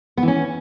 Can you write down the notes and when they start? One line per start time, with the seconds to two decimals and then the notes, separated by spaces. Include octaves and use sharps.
0.17 B3
0.23 E3
0.28 C#4